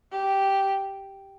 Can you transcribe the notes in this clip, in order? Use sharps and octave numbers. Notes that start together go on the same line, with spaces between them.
G4